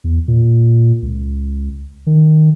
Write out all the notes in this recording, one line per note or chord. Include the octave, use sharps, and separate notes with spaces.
E2
A#2
C#2
D#3